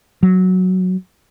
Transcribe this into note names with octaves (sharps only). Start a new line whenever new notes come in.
F#3